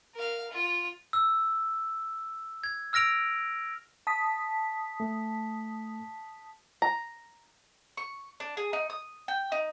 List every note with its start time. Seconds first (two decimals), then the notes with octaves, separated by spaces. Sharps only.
0.14 A#4 F5
0.50 F4
1.13 E6
2.64 G#6
2.93 E6 F6 A#6 D7 F7
4.07 A5 D#6 B6
5.00 A3
6.82 A#5
7.97 C#6
8.40 D4
8.57 G#4
8.73 D#4
8.90 D#6
9.28 G5
9.52 D#4